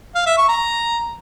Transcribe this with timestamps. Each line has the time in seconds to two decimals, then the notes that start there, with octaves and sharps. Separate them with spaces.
0.15 F5
0.26 E5
0.37 C#6
0.49 A#5